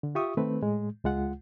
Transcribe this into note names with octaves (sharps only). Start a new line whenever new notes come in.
D3
F4 G4 E5 C#6 D#6
D#3 A3 C4 B4
A2 G#3
C#2 G#3 F4 F#5